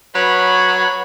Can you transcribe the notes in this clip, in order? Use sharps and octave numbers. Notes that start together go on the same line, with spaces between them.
F#3 B4 C#5 B5